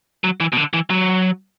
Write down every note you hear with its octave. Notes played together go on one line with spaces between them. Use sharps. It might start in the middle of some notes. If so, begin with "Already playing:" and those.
F#3
E3
B2
D3
E3
F#3